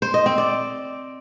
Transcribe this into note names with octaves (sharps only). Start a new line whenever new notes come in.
C5
D#5
C4
D5